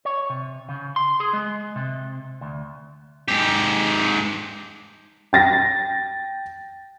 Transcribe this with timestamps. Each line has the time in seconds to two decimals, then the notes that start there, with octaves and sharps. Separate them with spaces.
0.05 C#5
0.30 C3
0.69 C#3
0.96 C6
1.20 G#4
1.33 G#3
1.76 C3
2.41 D2
3.28 G#2 G4
5.33 G5 A6 A#6